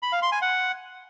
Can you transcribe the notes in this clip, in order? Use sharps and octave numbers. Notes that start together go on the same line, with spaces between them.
B5
F5
C6
G#5
F#5